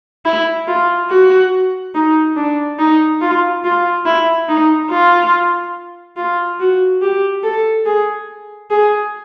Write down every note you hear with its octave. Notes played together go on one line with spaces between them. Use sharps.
E4
F4
F#4
D#4
D4
D#4
F4
F4
E4
D#4
F4
F4
F#4
G4
A4
G#4
G#4